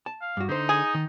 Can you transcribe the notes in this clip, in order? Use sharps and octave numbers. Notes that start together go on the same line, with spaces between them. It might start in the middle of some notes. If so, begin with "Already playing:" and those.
A5
F5
G2 F#4
D3 D#4 C5
G#4
D#3